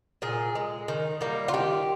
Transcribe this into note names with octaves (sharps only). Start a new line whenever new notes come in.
A#2 G#4
G#3
D#3
G3 A#3
F4
D#3 G4